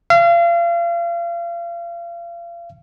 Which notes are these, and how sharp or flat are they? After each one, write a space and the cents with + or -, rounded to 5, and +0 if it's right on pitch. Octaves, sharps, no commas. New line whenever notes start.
F5 -35